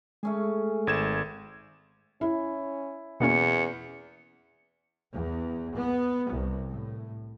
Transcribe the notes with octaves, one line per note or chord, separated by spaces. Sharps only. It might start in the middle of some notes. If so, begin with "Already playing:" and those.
G#3 A3 C#4 G#4
G#1 G#6 E7
C#4 E4
E2 B2 A#3 C#4 C#7
E2
B3
C2
A2